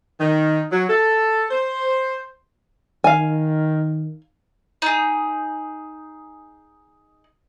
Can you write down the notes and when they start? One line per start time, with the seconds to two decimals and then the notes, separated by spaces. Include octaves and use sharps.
0.20 D#3
0.72 F#3
0.89 A4
1.51 C5
3.04 D#3 F5 G#5
4.82 D#4 G#4